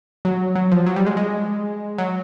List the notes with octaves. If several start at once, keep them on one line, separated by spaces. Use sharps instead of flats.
F#3
F#3
F3
F#3
G3
G#3
G#3
F#3